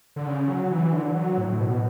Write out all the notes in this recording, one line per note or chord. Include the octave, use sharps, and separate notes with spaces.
D3
C#3
F#3
E3
D3
F#3
A2
B2